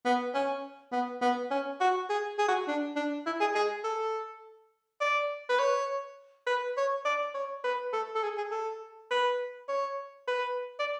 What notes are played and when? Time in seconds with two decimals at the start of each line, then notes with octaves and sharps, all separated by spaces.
0.05 B3
0.34 C#4
0.92 B3
1.22 B3
1.51 C#4
1.81 F#4
2.10 G#4
2.38 G#4
2.48 F#4
2.68 D4
2.96 D4
3.26 E4
3.40 G#4
3.55 G#4
3.84 A4
5.01 D5
5.49 B4
5.60 C#5
6.47 B4
6.77 C#5
7.05 D5
7.35 C#5
7.64 B4
7.93 A4
8.15 A4
8.23 G#4
8.38 G#4
8.51 A4
9.11 B4
9.69 C#5
10.28 B4
10.79 D5